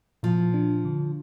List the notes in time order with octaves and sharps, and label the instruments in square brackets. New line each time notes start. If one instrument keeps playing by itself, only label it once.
[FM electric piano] A#2 [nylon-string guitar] F3
[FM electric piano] D4
D3